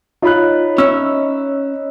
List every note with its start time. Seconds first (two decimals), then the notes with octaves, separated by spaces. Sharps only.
0.22 D#4 F4 C#5 D#5 B5 F#6
0.78 C#4 E5 E6